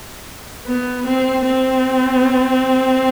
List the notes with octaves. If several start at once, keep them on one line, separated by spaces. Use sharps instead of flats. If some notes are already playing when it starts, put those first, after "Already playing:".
B3
C4
C4